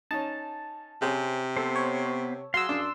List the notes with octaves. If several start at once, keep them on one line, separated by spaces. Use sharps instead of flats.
C#4 D#4 A5
C3 C4 C#4 G#4
B3 A4 C5
C#5
F#3 G#4 F5 C6 E6
F#2 D4